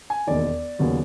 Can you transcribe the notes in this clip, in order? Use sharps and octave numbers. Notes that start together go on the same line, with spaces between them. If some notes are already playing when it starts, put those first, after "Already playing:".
G#5
E1 D#2 D#3 D5
D#2 C#3 F#3 B3